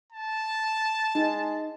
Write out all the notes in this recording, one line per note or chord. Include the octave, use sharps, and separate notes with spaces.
A5
G#3 D#4